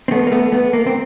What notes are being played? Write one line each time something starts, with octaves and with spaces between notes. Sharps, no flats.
C4
A3 B3
A#3
A3 B3
A3 B3
A#3
C4